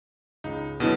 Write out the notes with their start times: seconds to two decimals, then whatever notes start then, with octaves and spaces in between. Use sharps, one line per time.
0.44 C#2 D#4
0.80 B2 D3 F#3 B3 D#4